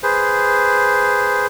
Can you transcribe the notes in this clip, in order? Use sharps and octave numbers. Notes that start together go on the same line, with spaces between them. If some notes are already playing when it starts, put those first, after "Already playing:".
G#4 B4 C5